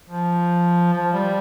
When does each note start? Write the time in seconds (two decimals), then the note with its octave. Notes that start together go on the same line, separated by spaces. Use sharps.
0.09 F3
0.93 F3
1.13 G3